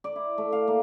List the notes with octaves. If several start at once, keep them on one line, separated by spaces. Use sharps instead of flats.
D5
E4
A3
F5
A#3